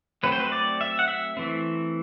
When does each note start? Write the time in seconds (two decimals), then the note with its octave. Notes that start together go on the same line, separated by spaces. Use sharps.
0.23 F#3 A3 C4 B4
0.32 C5
0.40 B4
0.52 D5
0.81 E5
0.99 F#5
1.08 E5
1.37 E3 A3 C4